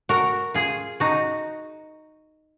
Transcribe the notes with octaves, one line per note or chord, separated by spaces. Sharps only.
F#4 A#4
F4 G#4
D#4 F#4